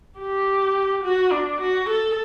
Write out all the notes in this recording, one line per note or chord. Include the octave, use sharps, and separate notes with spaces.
G4
F#4
D4
F#4
A4